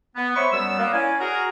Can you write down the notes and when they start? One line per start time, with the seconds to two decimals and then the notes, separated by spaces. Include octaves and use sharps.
0.16 B3
0.36 C5 C#5 E5 B5 C#6
0.52 F#2 G3 B3 E6
0.79 A#3 B3
0.93 C#4 E4 D5 F5 G#5
1.21 F#4 G#4 A#4